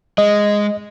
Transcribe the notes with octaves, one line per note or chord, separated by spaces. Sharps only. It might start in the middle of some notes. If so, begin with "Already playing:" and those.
G#3 D#5